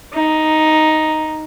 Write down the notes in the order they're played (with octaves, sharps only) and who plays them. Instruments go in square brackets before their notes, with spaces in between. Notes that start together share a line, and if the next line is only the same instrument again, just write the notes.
[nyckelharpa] D#4